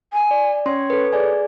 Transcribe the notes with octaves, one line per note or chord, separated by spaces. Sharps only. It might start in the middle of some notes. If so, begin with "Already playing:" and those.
G#5
D5
C#4 C#5 C6
A4 B4
G#4 D5 G#5